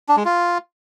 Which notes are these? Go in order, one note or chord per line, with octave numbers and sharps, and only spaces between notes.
D4
G#3
F4